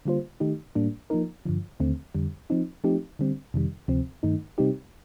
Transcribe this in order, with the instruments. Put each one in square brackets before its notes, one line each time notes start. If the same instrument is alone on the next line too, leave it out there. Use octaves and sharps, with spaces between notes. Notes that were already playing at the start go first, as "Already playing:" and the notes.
[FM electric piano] D3 G3 A#3 F4 C5
D#3 A3 D#4 G4
A2 G3 A#3 D4
F3 A#3 D#4 A#4
G2 D3 F3
D#2 D3 A3 C4
F2 D3 G3
F3 C4 D#4
F3 A3 C4 D#4 G4
D3 G3 C4
F2 C3 D#3 G3
D2 C3 F3 C4
G2 D#3 A3 D#4
C3 G3 C4 D#4 G4